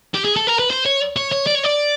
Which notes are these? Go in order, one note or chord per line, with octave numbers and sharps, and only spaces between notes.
G4
G#4
A4
A#4
B4
C5
C#5
C#5
C#5
D5
C#5
D5